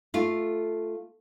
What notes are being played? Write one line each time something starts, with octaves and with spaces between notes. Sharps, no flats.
A3 F4